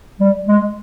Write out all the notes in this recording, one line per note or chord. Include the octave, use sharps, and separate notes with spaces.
G3
G#3